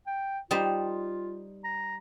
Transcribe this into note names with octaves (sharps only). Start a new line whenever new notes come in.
G5
G3 D#4 F4 C5
A#5